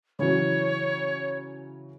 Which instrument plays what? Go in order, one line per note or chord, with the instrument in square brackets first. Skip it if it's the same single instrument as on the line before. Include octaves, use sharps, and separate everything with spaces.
[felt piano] C#3 E3 F#3 [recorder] C#5